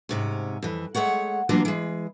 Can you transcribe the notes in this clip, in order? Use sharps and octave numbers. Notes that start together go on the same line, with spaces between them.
G#2 C3 C#4
F2 E3
G#3 A3 C#5 F#5
E3 F#3 A#3 B3 D4 F4
E3 G#3